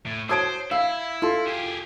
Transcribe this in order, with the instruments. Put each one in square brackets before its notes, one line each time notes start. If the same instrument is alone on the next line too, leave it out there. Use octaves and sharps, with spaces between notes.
[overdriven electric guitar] A2
[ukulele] F#4 C#5 A5 [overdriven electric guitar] C5 [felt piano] D#6 G#6 D7
[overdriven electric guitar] E4 [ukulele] F5 [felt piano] E6
[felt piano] F4 C6 [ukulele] A4
[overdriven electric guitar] G4 G#4